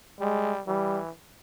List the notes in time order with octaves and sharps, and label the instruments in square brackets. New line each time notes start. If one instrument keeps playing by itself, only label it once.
[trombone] G3 [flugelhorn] G#3
[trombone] E3 [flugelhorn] G3